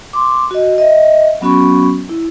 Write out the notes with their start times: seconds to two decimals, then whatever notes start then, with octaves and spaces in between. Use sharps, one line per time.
0.13 C6 D6
0.51 F#4 D#5
0.78 D#5 E5
1.41 F#3 B3 C#4 F#4 B5 C#6
2.09 E4